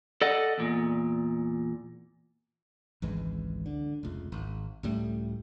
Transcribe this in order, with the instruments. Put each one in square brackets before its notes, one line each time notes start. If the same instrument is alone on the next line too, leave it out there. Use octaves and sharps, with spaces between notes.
[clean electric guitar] A4 D5 D#5 F#5
E2 A#2
[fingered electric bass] G#1 C#2 E3 G#3
D3
F1 C#2
G#1
C#2 A2 G3 A3